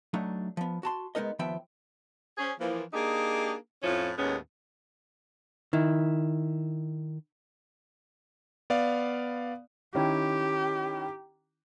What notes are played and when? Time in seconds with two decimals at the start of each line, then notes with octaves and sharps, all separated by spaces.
0.14 F#3 A3 D4 D#4
0.57 F3 B3
0.83 F#4 A5 C6
1.15 G#3 B3 D#4 A#4 D#5
1.39 D#2 F3 B3 E5 G5
2.37 C#4 G#4 C5
2.60 E3 F3 A#3
2.93 A#3 D4 D#4 G4 G#4
3.83 F2 A2 F3 C#4 E4 F4
4.17 D#2 A2 G#3 B3 C#4
5.73 D#3 E4
8.70 B3 D5 F5
9.95 D#3 C#4 E4 G4